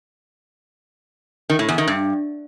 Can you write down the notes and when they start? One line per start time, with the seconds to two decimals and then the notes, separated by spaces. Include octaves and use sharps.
1.50 D#3
1.59 A2
1.69 E2
1.78 D#3
1.88 G2